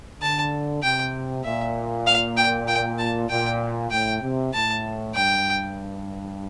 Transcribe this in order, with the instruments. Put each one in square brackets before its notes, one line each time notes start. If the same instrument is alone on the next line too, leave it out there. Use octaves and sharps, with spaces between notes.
[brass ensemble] D3 [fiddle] A5
[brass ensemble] C3 [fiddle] G5
[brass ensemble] A#2 [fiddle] E5
[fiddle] F5
G5
G5
A5
[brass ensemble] A#2 [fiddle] G5
[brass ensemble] A2 [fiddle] G5
[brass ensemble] C3
[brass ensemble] A2 [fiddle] A5
[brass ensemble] G2 [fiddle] G5